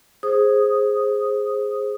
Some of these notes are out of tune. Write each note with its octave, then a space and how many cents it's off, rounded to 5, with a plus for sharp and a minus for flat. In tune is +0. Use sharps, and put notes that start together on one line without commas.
G#4 +0 C5 +10 D#6 +0